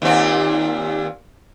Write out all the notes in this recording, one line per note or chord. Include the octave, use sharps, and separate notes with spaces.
D#2 A#2 C4